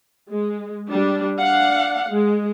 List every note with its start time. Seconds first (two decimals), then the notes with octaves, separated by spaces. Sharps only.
0.29 G#3
0.90 G3 D4
1.40 D4 F5 F#5
2.09 G#3